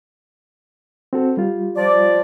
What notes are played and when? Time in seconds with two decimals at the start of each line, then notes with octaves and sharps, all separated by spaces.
1.13 C4 F#4 A4
1.37 G3 F4
1.77 F3 D5